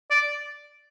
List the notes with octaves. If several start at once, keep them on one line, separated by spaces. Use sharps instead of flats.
D5